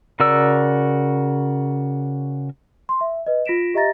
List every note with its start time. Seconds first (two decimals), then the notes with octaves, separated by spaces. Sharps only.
0.20 C#3 F#4 A#4 D5 E6
2.89 C6
3.01 E5
3.26 B4 D#5
3.46 F4 A#6 B6 D7 E7
3.74 G4 D#5 E5 A#5 A6 A#6